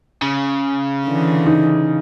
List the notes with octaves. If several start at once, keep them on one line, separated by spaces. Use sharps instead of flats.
C#3
D3 E3
D#4